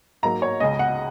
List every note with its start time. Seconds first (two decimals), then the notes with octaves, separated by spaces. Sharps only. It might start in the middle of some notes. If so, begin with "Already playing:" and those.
0.23 G#2 F#3 A#3 A#5
0.42 C#5
0.60 C#2 C#3 G#3 D#5
0.79 F#5